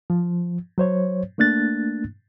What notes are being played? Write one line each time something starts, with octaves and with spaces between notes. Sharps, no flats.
F3
F#3 C5 C#5
A3 A#3 D4 F#6 A6